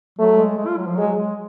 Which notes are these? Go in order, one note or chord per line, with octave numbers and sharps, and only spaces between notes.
F#3 A3
G#3
G#3
F4
F#3
F3
F#3 G#3
G#3